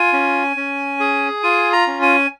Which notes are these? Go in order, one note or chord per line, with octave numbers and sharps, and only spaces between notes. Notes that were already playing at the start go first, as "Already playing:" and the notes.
Already playing: F4 G#5
C#4
C#4
G#4
F4 G#5
A#5
C#4
G#5